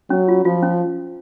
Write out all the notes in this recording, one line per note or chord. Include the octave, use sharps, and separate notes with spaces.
F#3 C#4
F4
F3 F4
C#4